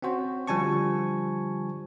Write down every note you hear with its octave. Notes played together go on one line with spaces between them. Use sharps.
C4 C#4 F#4 C5
D3 F3 G3 G#5 A5 C#6